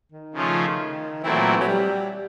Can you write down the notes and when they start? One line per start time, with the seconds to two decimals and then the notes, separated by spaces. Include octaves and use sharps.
0.12 D#3
0.34 C#3 F3 A3 C#4 F4
1.23 A#2 E3 F#3 A3 C4 E4
1.61 F#3
1.68 G3